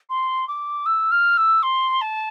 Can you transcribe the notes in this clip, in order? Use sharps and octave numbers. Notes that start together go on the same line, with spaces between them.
C6
D6
E6
F6
E6
C6
A5